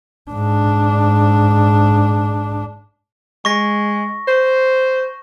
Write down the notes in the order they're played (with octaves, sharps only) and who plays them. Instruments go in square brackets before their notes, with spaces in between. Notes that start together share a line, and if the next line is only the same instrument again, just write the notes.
[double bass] G#2 D4
[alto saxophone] G#3 [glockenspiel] C#6 A#6
[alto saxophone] C5